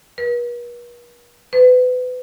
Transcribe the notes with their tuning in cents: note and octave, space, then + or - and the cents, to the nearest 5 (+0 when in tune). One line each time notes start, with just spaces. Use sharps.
B4 -45
B4 +30